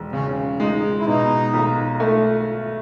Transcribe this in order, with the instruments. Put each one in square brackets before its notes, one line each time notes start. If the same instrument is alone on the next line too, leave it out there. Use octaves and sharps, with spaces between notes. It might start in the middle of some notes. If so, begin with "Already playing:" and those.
Already playing: [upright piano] E1
[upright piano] C#3 [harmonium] C#4
[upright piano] G#3 [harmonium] D#4
[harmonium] E4
[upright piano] B2 [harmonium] D#4
[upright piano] B1
A3